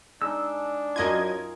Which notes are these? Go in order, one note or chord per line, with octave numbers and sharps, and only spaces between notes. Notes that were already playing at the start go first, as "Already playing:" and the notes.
G#3 D4 D#4 E6
F#2 F4 A#4 D#5 G#6